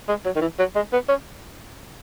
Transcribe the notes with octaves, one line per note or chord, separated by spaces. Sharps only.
G#3
F#3
D#3
E3
F#3
G#3
B3
C#4